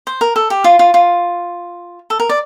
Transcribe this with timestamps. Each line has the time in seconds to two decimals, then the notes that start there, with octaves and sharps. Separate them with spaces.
0.07 C5
0.21 A#4
0.36 A4
0.50 G4
0.64 F4
0.79 F4
0.94 F4
2.10 A4
2.20 A#4
2.29 D5